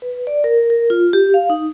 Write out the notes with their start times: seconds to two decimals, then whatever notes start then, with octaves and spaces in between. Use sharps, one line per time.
0.02 B4
0.27 D5
0.44 A#4
0.70 A#4
0.90 F4
1.13 G4
1.34 F5
1.50 D#4